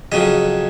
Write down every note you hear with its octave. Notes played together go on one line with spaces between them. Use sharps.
F2 C#3 F#3 D#5